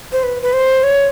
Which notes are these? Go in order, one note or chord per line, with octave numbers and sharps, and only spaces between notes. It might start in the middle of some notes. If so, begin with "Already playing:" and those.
C5
B4
B4
C5
C#5